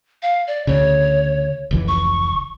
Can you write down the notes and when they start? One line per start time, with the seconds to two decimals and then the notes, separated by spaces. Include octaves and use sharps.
0.23 F5
0.47 D5
0.67 D2 C#3 C#5
1.71 F1 C#2 E3
1.88 C#6